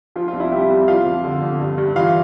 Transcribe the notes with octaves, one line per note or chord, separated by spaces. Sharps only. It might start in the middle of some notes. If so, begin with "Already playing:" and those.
F3 F4
F4
C2
E4
C3 G3 G4
C2
F3 F4 F5
F2
D3
F2
G2
G2
E3 F4 F5